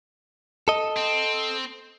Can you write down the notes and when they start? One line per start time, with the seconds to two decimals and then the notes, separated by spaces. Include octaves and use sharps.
0.68 A4 D#5
0.97 C4